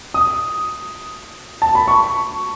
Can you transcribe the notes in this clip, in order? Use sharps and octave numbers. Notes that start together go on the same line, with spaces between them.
D#6
A5
B5
C#6